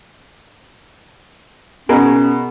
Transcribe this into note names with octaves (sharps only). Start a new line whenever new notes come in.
B2 C#4 G#4 A#4